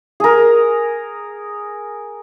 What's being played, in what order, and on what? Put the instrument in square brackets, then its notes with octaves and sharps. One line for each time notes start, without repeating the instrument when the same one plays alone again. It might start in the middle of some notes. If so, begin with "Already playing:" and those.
[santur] G#4 A#4